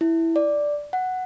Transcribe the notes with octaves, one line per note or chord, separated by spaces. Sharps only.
E4
D5
F#5